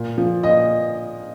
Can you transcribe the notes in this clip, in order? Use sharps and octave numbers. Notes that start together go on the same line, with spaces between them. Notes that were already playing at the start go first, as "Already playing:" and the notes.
Already playing: A#2
F3
A#2 D#5